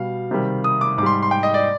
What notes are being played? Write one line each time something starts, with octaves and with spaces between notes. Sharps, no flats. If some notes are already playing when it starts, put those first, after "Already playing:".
Already playing: B2 G3 F5
C3 D#3 G3
D#6
D6
G#2 G3 C6 D6
C6
G5
D#5
D5